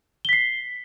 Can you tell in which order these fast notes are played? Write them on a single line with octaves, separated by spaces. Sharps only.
G7 B6 C7